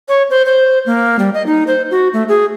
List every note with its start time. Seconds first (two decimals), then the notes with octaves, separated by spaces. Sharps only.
0.08 C#5
0.30 C5
0.45 C5
0.86 A#3
1.19 G3
1.34 D#5
1.46 D#4
1.67 C5
1.91 F#4
2.13 A3
2.29 G#4